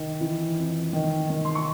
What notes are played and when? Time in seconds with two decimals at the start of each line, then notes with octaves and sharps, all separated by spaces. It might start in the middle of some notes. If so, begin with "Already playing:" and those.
Already playing: D#3
0.21 E3
0.58 F2
0.93 D#3
1.30 D#3
1.45 C6
1.55 C#6